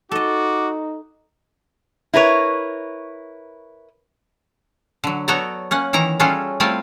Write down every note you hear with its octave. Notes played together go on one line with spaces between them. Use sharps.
D#4 F#4 A4 D#5 D6
E4 A#4 B4 C#5
D3 F#3
B3 F#4 A4 C#5 D5 A#5
A#3 C#4 F#5
D#3 E3 E4 A#5
G3 C#4 F4 F#4 G#4 A4
G3 A3 C4 E4 F4